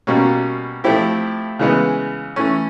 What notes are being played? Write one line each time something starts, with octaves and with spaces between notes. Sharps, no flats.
B2 G3 A#3 C#4
F3 A3 C4 E4 G4
C#3 E3 G#3 B3
E3 A3 C#4